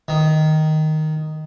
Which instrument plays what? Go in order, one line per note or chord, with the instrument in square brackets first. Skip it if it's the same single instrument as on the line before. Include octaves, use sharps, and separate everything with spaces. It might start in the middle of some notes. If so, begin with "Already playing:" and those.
[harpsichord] D#3